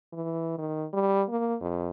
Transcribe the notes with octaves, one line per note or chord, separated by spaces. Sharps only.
E3
D#3
G3
A#3
F2